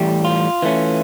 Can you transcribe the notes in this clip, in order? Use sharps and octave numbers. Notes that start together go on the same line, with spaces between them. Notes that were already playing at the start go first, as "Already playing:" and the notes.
Already playing: A2 E3 G3 G4
F4
E3 A3 C#4